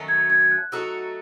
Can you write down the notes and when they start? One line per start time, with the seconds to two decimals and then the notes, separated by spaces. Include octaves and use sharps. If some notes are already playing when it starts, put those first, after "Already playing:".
Already playing: D#3 F#3 A3 C#4
0.08 G#6
0.30 G#6
0.42 G#6
0.51 F#6
0.72 F#3 A3 D#4 F#4 E6